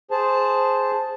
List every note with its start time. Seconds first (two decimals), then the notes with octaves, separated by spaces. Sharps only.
0.11 G#4 C5 A5